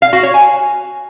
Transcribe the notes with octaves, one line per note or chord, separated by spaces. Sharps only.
F5
F#4
C#5
G#5